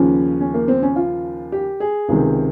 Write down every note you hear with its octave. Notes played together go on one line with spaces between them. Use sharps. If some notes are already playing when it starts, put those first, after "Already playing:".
Already playing: D#2 C#3 F3 C#4
C#4
A#3
C4
C#4
F4
G4
G#4
C#2 C3 D#3